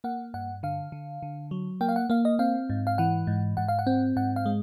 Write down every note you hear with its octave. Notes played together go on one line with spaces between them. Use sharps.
A#3 F#5
G2 F#5
D3 F5
D3
D3
F#3
A#3 G5
F5
F#5
A#3 F5
D#5
C4 F5
G#2
F5
E3 F#5
G#2
G#2 F#5
F5
F#5
C4
G#2 F#5
F5
G#3